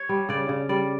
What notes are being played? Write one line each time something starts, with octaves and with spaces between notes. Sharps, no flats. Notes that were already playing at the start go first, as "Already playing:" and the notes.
Already playing: C#5
G3
C#3 D5
C#3
G3 D5